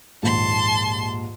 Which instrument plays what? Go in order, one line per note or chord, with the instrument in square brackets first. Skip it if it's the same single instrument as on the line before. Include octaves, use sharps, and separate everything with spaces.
[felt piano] A#1 D#2 G#2 [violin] A5 C6